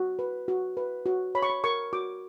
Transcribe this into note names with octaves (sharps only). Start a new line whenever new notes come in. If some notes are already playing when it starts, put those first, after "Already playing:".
Already playing: F#4
B4
F#4
B4
F#4
C#5 B5
C#6
B5
A#4 C#6
F#4 D6